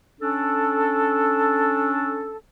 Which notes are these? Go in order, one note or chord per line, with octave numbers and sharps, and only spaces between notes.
C#4 D4 A4